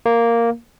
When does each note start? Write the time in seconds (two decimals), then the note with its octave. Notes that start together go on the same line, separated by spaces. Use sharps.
0.06 A#3